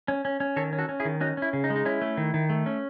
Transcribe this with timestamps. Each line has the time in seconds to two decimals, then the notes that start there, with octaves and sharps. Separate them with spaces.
0.08 C#4
0.25 C#4
0.40 C#4
0.56 D#3 A4 C#5
0.73 C#4
0.78 F#4 A4
0.89 C#4
1.00 E4 G#4
1.05 D#3
1.21 C#4 D#4 F#4
1.37 C#4 E4
1.53 C#3
1.64 D#4
1.70 G#3
1.76 D#4
1.85 C#4 E4
2.02 A3
2.17 D#3
2.34 D#3
2.50 A3
2.66 C#4